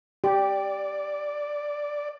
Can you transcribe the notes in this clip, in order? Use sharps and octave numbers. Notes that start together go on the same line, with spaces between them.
G4 D5